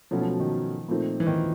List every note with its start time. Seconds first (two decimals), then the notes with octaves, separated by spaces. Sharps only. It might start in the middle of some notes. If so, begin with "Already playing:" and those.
0.11 B2 F3 F#3 A3 C#4
0.21 F3
0.40 D#3
0.88 A#2 F3 A3 C4 D#4
1.20 E3
1.27 D#3